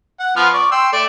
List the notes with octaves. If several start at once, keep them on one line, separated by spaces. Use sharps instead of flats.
F#5
F3 B3 F6
D5 C#6
G5 C6 E6
A3 D5